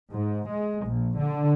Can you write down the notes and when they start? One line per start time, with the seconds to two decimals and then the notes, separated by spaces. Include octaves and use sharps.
0.11 G#2
0.48 G#3
0.87 A#1
1.17 D3